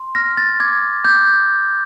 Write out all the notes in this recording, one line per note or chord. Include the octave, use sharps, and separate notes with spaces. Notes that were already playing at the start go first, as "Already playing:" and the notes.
Already playing: C6
F6 A#6
A6
D6 G#6
D6 G6